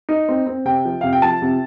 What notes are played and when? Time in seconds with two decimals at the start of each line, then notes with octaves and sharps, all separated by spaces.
0.09 D#4
0.29 C4
0.47 C4
0.65 C3 G5
0.85 F3
1.01 C3 F5
1.13 G5
1.22 F3 A5
1.42 C3